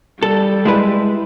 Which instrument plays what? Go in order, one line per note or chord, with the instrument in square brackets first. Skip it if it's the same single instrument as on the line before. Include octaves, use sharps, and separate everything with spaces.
[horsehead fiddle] G3 [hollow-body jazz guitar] A4
[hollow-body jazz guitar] G#3 E4 B4